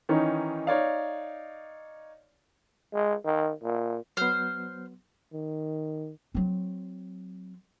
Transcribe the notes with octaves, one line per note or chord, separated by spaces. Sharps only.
D#3 E3 C#4 D#4
D#4 C#5 D5 F5
G#3
D#3
A#2
F#3 B3 C5 F6
D#3
F#3 C4